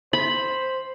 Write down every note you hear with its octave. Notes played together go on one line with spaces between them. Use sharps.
C5 B5